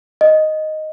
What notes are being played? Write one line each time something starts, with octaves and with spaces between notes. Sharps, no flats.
D#5